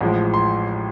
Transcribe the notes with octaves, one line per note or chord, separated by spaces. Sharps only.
A1 A2 F3 G#3
C6